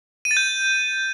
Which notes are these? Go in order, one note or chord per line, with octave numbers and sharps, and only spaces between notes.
D#7
A6
G6